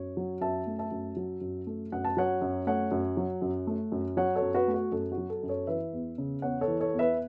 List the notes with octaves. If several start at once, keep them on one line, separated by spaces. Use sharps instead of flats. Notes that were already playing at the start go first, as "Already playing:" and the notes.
Already playing: F#2 C#5
F#3
F#2 E5 A5
A3
E5 A5
F#2
F#3
F#2
A3
F#2 F#5
A5
F#3 C#5 F#5
F#2
A3 C#5 F#5
F#2
F#3
F#2
A3
F#2
F#3 C#5 F#5
A4 C#5
F#2
F#4 B4
A3
F#4
F#2 A4
F#4
F#3
A4
F#2
A4 C#5
E3 B4 E5
E2
C#3
E2 C#5 F#5
A4 C#5
E3
A4 C#5
E2
B4 E5